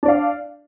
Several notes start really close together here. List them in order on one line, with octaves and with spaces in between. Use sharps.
D4 D5 F5